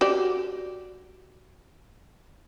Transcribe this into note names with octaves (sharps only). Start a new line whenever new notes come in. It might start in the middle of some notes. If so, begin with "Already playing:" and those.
F#4 G4 D5